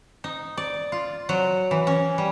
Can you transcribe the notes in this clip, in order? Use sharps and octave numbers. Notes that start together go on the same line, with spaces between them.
D#4
D5
F4
F#3
E3
C#4
G3